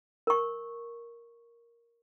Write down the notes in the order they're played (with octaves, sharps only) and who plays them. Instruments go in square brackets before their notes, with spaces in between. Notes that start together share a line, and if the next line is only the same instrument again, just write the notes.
[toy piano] A#4 C#6